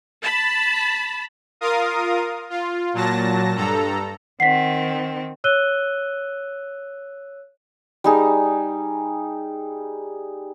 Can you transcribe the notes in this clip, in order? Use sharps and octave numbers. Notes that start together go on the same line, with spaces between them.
A5 B5
F4 A#4 F5 D#6
F4
A#2 F#3 A5 A#6
G2 A4 A#5
D#3 C4 F#5 B6 C7
C#5 E6 F#6 D#7 G7
G3 D#4 G#4